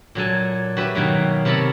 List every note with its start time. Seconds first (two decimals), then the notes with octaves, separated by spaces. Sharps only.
0.15 A#2 F#3 A4 G#5
0.77 F#4 G4 B4 E5
0.95 B2 D#3 F#3 A#3
1.45 C3 B3 A4 A#4 C#5 B5